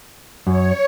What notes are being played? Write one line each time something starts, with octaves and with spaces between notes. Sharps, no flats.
F#2 C#5